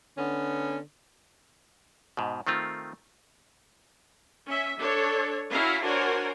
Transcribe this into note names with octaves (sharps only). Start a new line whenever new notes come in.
D3 B3 C#4
G#2 B2
D#3 A3 C4 F4
C#4 E5
D4 A4 C#5
C#4 E4 F#4 E5 F5 A#5
D4 F#4 A#4 C5 C#5 G#5